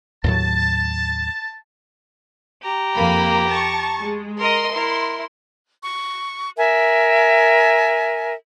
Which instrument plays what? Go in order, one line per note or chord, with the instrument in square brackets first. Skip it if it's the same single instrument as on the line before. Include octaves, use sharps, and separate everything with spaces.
[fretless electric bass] D#2 A2 F#3 [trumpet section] A5
[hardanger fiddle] G4 A#5
[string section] F2 A#3 B5
A5 C#6
G#3
[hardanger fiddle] A#4 D#5 [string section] C6
[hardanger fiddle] E4 A#4
[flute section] C#6
A#4 E5 G#5